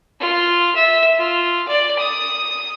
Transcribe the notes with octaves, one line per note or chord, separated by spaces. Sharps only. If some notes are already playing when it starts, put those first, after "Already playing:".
F4
E5
F4
D5
D#6